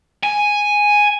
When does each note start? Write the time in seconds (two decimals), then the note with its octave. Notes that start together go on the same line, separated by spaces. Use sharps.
0.23 G#5